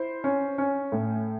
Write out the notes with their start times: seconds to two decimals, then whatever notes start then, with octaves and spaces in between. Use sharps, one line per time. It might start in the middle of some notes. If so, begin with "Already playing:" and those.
Already playing: E4 C5
0.24 C#4
0.58 C#4
0.92 A2